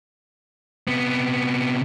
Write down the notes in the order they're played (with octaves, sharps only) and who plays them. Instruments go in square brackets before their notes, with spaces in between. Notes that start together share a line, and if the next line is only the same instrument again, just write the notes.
[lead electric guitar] C3 B3